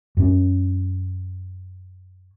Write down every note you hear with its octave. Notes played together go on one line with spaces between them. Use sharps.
F#2 C#4